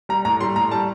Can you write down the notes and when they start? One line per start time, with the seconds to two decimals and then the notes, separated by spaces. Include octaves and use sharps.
0.09 G3 A#5
0.25 A2 A#5
0.41 G3 C6
0.56 A2 A#5
0.71 G3 A5